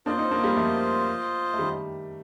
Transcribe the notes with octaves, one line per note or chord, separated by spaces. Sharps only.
A#3 D4 F4 C5 D#5
C4 D#4
A#3 D4
G3 A#3
F3 A3
A3
D#3 G3